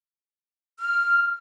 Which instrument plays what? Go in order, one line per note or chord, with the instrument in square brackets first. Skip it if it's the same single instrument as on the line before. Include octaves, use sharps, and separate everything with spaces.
[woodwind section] F6